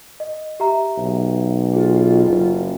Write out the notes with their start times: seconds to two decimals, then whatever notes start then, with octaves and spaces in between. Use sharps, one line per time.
0.20 D#5
0.60 G4 E5 A#5
0.97 B1
1.74 F4 G#4
2.26 F#1